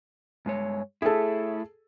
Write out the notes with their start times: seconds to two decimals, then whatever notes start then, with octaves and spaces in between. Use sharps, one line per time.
0.46 G2 G#3 C#5
1.02 A3 E4 G#4 A4